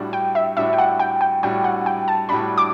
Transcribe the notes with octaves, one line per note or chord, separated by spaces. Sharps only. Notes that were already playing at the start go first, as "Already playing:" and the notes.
Already playing: A2 G3 D4 F#4
G5
E5
A2 G3 D4 F#4 E5
G5
F#5
G5
G5
A2 G3 D4 F#4 G5
F#5
G5
A5
A2 G3 D4 F#4 B5
D6